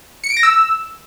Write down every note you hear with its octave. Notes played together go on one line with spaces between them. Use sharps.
C#7
D7
A#6
E6